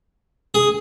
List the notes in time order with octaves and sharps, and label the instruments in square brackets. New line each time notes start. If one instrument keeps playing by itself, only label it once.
[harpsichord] G#4